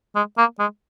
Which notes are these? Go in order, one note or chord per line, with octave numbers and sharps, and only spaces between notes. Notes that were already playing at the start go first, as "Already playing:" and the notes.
G#3
A#3
G#3